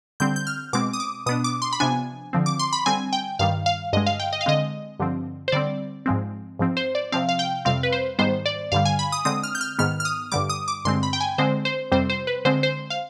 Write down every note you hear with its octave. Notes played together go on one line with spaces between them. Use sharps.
D3 G3 C4 G6
G6
F6
B2 G#3 C4 D6
D#6
D6
B2 B3 D4 D#6
D6
C6
B5
C3 F3 B3 D4 G#5
D3 F3 C4
D6
C6
B5
D3 G3 C4 G#5
G5
G2 D#3 G3 F5
F5
G2 D3 G#3 D#5
F5
G5
D#5
F5
D3 G#3 C4 D#5
G2 D3 F3 C4
C5
D3 G3 C4 D5
G#2 F3 G#3 C4
G#2 F3 C4
C5
D5
C3 F3 C4 F5
F5
G5
F2 C3 G3 C4 F5
B4
C5
G#2 D#3 G3 B3 C5
D5
G2 D3 G3 F5
G#5
B5
D#6
D3 G#3 C4 D#6
F6
G6
F6
G#2 D#3 B3 F6
F6
D#6
G2 D3 G3 D6
D#6
D6
G2 D3 G#3 C4 C6
B5
G5
G#5
D3 G#3 C4 C5
C5
F2 C3 G3 C4 C5
C5
B4
D3 G#3 C4 C5
C5
F5